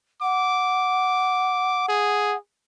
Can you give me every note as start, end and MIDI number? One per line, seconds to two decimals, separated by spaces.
0.22 2.37 78
0.22 1.87 86
1.89 2.37 68